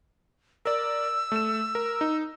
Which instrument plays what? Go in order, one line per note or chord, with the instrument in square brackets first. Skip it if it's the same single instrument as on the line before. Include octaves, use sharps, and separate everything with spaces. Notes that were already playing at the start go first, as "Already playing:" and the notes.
[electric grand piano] A#4 D5 [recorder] E6
[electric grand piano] A3 E7
A#4
D#4